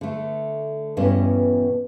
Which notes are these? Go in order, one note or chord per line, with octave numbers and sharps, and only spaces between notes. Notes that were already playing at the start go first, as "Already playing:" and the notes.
D3 A3
E2 G2 B2 B3 C#4 D#5